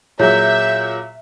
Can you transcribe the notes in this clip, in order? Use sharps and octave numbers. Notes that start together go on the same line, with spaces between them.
A#2 F#3 G#4 C#5 E5 G6